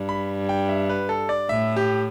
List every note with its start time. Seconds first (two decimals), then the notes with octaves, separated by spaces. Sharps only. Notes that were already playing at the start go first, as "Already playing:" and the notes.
Already playing: G2
0.09 B5
0.49 G5
0.69 E5
0.90 B4
1.09 A4
1.29 D5
1.49 A2 E5
1.76 G4